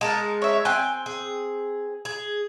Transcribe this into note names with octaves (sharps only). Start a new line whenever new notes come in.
G#3 D#4 A#4 A5
C#5 E5
C4 G5 G#5 F#6
G#4
G#4